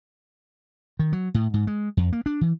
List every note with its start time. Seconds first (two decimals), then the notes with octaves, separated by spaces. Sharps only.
0.99 D#3
1.13 F#3
1.34 A2
1.54 G#2
1.67 G#3
1.97 F2
2.13 A#3
2.26 D4
2.41 E3